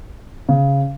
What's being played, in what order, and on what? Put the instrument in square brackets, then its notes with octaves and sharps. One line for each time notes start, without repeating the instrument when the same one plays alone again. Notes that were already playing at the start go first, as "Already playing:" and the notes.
[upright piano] C#3